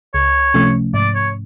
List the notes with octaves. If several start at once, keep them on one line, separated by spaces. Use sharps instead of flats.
C#2 C#5
C3 F3 A3 C#4
G#2 D5
C#5